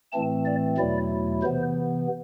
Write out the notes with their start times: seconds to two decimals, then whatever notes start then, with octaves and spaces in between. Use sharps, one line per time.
0.12 A2 E3 A3 C4 A5
0.46 D5
0.77 E2 B2 F#3 A3 E4 D5
1.43 C3 E3 B3 C5